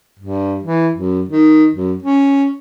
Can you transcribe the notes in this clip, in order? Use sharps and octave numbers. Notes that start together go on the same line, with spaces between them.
G2
E3
F#2
D#3
F#2
C#4